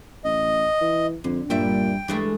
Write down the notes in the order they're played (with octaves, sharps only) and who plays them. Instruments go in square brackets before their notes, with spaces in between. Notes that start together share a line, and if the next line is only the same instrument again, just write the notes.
[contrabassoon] A1 [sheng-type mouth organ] D#5
[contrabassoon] E3
[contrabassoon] F2 [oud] D3
[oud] G2 G3 E5 [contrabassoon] A#2 [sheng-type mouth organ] G5
[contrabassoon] G2 [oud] E3 G#3 A3